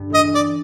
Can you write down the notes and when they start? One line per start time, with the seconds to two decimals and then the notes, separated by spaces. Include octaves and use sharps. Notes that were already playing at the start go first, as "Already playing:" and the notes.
Already playing: G2 D3
0.10 A1 D#5
0.25 A1
0.35 D5